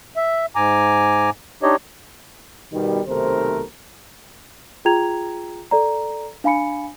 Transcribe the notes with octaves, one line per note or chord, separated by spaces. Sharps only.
E5
G#2 G#5 A#5 D6
D4 D#4 G4 C#5 D#5
B2 D#3 G3
B1 C3 D#3 A3 A#4 C5
F4 G#4 G5 A#5 G#6 F7
A4 D5 A#5
D4 F5 G#5 B5 C#7